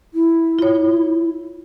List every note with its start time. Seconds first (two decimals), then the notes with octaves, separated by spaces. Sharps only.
0.14 E4
0.59 F4 C#5